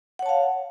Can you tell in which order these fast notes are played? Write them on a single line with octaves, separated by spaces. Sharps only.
F#5 C#5 A5 F5